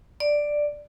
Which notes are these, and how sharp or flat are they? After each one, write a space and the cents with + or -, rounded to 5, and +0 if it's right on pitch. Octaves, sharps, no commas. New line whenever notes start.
D5 +5